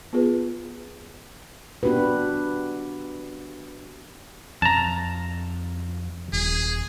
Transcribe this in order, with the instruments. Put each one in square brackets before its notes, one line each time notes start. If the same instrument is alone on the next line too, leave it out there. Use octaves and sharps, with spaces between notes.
[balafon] B3 F4 G#4 B4
[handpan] B3 D4 F#4 G4 B4
[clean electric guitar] F2 [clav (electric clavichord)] A5 A#5
[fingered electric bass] D#1 [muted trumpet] G#4